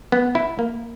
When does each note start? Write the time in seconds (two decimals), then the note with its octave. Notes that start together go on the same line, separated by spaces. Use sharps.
0.12 B3
0.35 E4
0.59 A#3